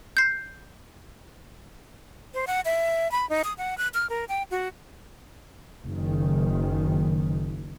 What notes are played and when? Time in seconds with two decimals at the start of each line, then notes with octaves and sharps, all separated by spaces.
0.17 G6 C7
2.34 C5
2.47 F#5
2.65 E5
3.12 B5
3.30 D#4
3.44 D#6
3.58 F#5
3.78 F#6
3.94 F6
4.10 A#4
4.29 G5
4.51 F#4
5.86 F#1 D#3